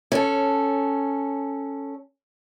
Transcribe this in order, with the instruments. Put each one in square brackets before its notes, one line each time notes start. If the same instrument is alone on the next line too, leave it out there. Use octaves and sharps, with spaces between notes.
[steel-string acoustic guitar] C#4 A4